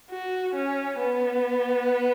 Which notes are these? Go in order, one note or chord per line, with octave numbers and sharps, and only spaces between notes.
F#4
C#4
B3